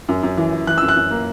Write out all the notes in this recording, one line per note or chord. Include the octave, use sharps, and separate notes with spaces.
F#2
F#2
E3
E3
E3 F#6
F#2 E6
F#6
F#2
A#3